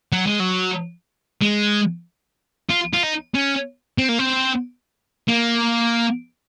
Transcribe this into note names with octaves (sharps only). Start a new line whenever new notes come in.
F#3
G#3
F#3
G#3
F4
F4
D#4
C#4
C4
A#3
C4
A#3